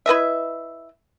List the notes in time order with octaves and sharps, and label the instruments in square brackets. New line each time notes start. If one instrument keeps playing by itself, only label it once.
[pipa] E4 B4 D#5 E5